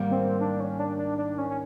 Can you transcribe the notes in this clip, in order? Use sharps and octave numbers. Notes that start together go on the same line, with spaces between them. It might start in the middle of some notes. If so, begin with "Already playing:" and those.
Already playing: G#2 D#3 G3 A#3
C4
D4
C#4
D4
D4
D4
C#4
C#4